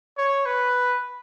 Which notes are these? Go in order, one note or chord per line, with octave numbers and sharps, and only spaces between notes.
C#5
B4